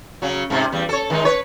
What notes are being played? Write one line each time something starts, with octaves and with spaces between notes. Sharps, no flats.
C#3 F#3
G#2 C3
E2 G3
A4 C#5
D#3 G#3 D#4
B4 C#5